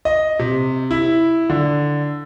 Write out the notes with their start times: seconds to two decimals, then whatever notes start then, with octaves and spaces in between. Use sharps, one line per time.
0.05 D#5
0.39 C3
0.91 E4
1.50 D3